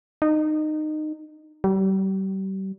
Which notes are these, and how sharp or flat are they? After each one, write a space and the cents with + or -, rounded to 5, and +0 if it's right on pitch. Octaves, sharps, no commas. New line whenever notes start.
D#4 -20
G3 -35